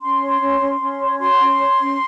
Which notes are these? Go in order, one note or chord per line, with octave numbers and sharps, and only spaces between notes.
C#4 C6
C#5
C#4
C#4
C#4
C#5
F#4 C6
C#4
C#5
C#4